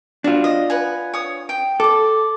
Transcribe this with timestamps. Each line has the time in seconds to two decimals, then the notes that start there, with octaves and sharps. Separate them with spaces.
0.24 D4 F4 F#4
0.44 D#5
0.70 B4 F#5 G#5
1.14 C#5 D#6
1.49 G5
1.80 A4 D5 D6